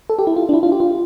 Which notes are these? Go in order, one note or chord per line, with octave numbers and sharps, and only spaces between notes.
A4
G4
E4
F4
D4
E4
F4
G4
F4